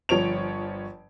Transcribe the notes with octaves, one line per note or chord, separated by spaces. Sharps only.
G1 F3 C#5 D7 F7